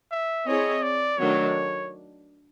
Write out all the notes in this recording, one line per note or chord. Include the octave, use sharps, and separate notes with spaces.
E5
C4 E4 G#4 C#5 D#5
D5
D#3 F#3 A3 D4 C#5